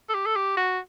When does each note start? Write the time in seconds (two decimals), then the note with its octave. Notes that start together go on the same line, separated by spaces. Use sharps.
0.10 A4
0.14 G4
0.26 A4
0.36 G4
0.57 F#4